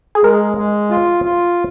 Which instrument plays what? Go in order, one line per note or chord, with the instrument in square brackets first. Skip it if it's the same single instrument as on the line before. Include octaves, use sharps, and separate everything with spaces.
[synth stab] G#4
[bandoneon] G#3 [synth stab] A#4
[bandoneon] G#3
F4
F4